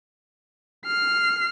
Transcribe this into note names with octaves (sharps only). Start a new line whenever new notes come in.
F6 C7